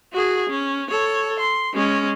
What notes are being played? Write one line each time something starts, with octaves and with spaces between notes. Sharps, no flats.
F#4 G#4
C#4
A4 C#5
C6
G#3 C#4